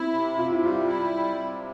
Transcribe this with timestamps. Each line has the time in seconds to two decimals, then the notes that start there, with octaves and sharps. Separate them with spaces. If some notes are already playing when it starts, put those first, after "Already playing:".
Already playing: C4 E4
0.13 C3
0.38 C3 F4
0.52 E4
0.63 G3 F4
0.88 E4
1.13 G3
1.38 C3